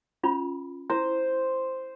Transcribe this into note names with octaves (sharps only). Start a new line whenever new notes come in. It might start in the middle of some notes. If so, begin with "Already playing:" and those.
C#4 F4 B5
E4 C5